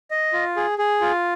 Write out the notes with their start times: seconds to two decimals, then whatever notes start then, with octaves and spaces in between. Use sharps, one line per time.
0.11 D#5
0.33 F4
0.57 G#4
0.78 G#4
1.01 F4